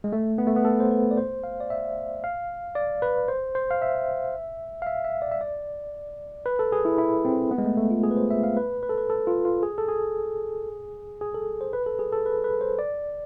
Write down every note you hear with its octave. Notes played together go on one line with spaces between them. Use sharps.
G#3
A3
B3
A3
B3
A4
C5
B4
D5
C5
F5
D5
E5
F5
D5
B4
C5
C5
F5
E5
F5
E5
E5
D5
E5
D5
B4
A4
G#4
E4
E4
C4
B3
G#3
A3
A3
F4
G#4
B4
C5
E5
F5
B4
B4
A4
B4
A4
F4
F4
G#4
A4
G#4
G#4
A4
C5
B4
A4
G#4
A4
B4
B4
C5
D5